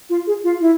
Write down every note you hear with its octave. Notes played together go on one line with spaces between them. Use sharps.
F4
G#4
F4
E4